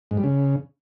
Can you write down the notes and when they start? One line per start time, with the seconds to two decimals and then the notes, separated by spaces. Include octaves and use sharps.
0.11 G#2
0.17 G3
0.24 C#3